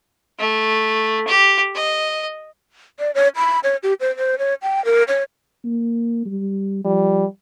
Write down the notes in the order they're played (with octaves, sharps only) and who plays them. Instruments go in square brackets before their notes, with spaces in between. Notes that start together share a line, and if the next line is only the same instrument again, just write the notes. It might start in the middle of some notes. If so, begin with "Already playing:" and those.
[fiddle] A3
G4
D#5
[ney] D5
C#5
B5
C#5
G4
C5
C5
C#5
G5
A#4
C#5
[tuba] A#3
G3
[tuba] F3 [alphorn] G3